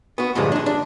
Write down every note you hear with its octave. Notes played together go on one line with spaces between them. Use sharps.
B3 F#4
G2 A#2 D3 F3 G#3
D4 D#4
D4